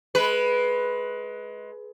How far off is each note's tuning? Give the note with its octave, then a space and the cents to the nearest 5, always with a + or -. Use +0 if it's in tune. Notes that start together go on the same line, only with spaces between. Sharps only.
G#3 +25 B4 +0